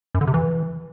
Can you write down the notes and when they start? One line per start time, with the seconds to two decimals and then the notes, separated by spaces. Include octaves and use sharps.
0.15 F#2
0.21 D3
0.27 C3
0.34 E3